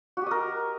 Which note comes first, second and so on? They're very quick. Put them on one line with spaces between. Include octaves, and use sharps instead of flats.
F#4 G4 D#5 A#4